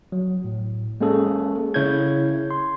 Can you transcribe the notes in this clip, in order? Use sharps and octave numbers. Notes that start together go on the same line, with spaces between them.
F#3
A2
G#3 A#3 C#4 G#4 A4
C#3 E4 C#5 G6 G#6
C6